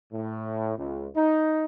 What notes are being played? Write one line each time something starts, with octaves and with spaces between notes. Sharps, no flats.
A2
C#2
D#4